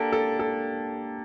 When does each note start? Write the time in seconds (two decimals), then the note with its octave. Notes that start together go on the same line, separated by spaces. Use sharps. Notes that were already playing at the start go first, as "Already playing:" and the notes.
Already playing: A#3 D4 G4 A4
0.12 A4
0.39 A4